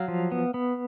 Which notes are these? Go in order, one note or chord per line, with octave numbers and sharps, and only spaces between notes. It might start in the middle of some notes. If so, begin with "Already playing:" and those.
Already playing: F#3 F5
F3
B3
B3